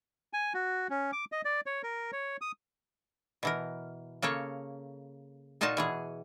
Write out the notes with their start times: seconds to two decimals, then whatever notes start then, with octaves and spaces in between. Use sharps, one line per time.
0.33 G#5
0.54 F#4
0.90 C#4
1.13 D6
1.32 D#5
1.45 D5
1.66 C#5
1.83 A#4
2.12 C#5
2.41 D#6
3.43 B2 E3 A#4
4.22 C#3 A#3 A4 C#5
5.61 A#2 D#4 F4 F#4 A5
5.77 B2 E3 G#4